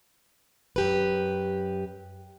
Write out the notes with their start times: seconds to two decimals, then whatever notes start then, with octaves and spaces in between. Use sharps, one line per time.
0.76 F#2 G4 B4